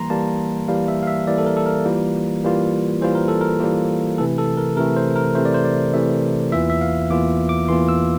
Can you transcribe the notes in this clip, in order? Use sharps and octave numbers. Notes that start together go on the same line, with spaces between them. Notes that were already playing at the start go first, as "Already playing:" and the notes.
Already playing: E3 G3 A#3 A#5 C6
E3 G3 A#3 A5
E3 G3 A#3 F5
E5
F5
E5
E3 G3 A#3 D5
A4
A#4
A4
A#4
E3 G3 A#3 F4
E3 G3 A#3 F4
E3 G3 A#3 F4 C5
A#4
A4
A#4
E3 G3 A#3 F4
C3 E3 A3 A4
A4
A#4
C3 E3 A3 A#4
C5
A#4
C3 E3 A3 C5
D5
C5
D5
C3 E3 A3 E5
E2 E3 A#3 F4 E5
E5
F5
E2 E3 A#3 F4 D6
D6
E2 E3 A#3 F4 C6
E6